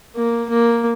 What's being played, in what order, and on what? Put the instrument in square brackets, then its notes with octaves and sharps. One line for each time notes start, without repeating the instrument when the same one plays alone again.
[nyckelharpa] A#3
A#3